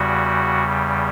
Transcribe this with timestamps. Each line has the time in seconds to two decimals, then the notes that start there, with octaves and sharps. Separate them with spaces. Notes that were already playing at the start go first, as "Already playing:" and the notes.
Already playing: E2 C#3 G3 F#4